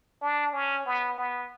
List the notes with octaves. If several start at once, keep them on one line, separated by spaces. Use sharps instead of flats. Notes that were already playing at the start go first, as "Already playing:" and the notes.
D4
C#4
B3
B3